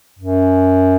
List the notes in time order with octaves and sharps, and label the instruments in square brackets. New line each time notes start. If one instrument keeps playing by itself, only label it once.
[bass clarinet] F#2